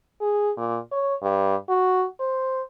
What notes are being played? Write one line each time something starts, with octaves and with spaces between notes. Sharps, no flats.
G#4
A#2
C#5
G2
F#4
C5